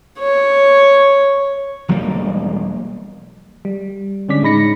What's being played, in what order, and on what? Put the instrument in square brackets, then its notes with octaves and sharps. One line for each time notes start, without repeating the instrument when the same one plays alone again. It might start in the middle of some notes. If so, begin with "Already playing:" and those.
[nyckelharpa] C#5
[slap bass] E1 F#3 G3 A#3
[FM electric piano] G3
D3 G#3 C#4 D4 D6 B6
A2 G#3 D#4 B5 A#6 C#7